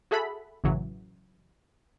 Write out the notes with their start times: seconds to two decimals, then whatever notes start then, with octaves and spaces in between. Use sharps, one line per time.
0.11 F#4 G#4 A4 E5 F#5 B5
0.64 A1 F#2 C#3 E3 F#3